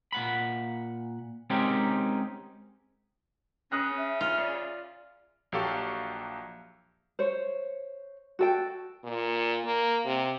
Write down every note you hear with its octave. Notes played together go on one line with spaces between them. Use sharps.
A#2 F#5 B5
G#3 C4 C#4 D#4 G4 A#4
C#3 C#4 D#6 F#6 A#6
E5
F4
D5
A#1 F#3 G4 A4 F5 C#6
C5 C#5
F#4 A4 G5
A#2
A#3
C3